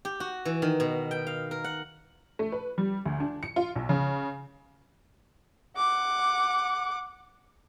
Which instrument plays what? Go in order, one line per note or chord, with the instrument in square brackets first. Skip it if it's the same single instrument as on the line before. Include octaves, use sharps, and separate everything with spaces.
[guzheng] G4
F#4
E3
D#3
B2
G5
F5
A#4
F#5
[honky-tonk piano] A3
B4
G3
D2
D4
C#7
F4
B1
C#3
[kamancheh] F#5 D6